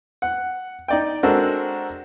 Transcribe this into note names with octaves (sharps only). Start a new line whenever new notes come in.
F#5
D#4 D5 G5
G#3 C4 D4 F#4 A4 A#4